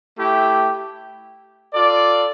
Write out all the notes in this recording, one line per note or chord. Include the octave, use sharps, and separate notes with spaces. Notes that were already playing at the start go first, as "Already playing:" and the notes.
A3 E4 G4
F4 A4 D5